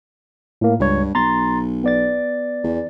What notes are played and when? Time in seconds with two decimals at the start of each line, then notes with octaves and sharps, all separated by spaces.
0.61 A2 A#3
0.80 C#2 G2 C#5
1.15 B1 A#5 C6 A6
1.84 B3 D5 A6
2.64 E2